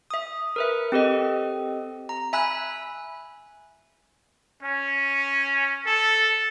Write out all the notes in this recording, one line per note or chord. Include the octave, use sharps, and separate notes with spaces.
E5 D#6
A#4 B4 E5
C4 G4 A4 D#5
A#5
E5 G#5 B5 E6 F#6
C#4
A4